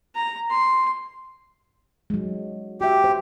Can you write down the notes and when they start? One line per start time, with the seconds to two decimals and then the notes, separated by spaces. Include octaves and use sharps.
0.15 A#5
0.50 C6
2.10 F#3 G#3
2.81 F#4 G4 E5
3.04 C5